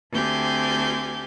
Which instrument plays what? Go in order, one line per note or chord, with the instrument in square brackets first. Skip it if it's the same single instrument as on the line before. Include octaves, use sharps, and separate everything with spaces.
[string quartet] D2 C4 G4 G#5 G6